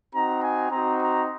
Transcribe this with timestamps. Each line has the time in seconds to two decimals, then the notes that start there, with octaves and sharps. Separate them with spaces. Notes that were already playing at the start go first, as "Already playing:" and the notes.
0.14 C4 D#4 F#4 A#5
0.42 G#5
0.71 C4 D#4 F#4 A#5
1.00 A#5